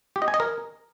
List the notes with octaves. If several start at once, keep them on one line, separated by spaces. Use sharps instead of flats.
G4
D#5
G#5
D#5
A#4